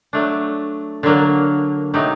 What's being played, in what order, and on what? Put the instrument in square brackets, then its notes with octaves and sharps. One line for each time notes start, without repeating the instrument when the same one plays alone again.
[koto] F#3 A3 D4
D3 F#3 A#3
C3 F#3 A3 D#4 G4